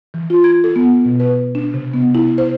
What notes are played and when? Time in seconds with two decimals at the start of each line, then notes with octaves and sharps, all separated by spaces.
0.14 E3
0.30 F4
0.44 G#6
0.64 A4
0.76 B3
1.05 B2
1.20 B4
1.55 D4
1.74 C3
1.94 B3
2.15 E4
2.38 C5